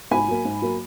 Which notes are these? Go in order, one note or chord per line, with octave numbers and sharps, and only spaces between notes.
G#2 G#5 B5
F#3 A#3
G#2
F#3 A#3